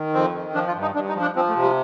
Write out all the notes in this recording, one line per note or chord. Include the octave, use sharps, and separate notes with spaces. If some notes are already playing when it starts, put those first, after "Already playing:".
Already playing: D#3
F2 C4
D#3
F3 D4
F4
G2
D#4
G2 D4
D#4
F3
D4
F3 C4
A3
C3
G3